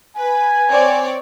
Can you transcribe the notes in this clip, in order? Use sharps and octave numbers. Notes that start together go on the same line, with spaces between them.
B4 G#5
C4 C#5 D5